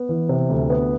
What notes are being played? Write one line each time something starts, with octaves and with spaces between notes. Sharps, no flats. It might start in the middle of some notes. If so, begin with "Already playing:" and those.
Already playing: B3
E3
C3
D2
B3